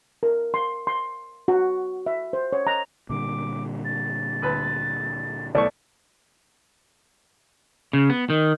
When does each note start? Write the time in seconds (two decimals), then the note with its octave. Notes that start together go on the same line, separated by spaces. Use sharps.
0.23 A#4
0.54 C6
0.87 C6
1.48 F#4
2.06 E5
2.33 C5
2.53 C#5
2.67 A#5
3.10 A#2 D3 G3 D6
3.85 A6
4.42 D2 B4
5.55 B1 A3 D5 C#6
7.93 C#3
8.10 B3
8.30 D#3